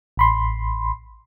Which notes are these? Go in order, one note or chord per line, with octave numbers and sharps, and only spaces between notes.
A1 B5 C6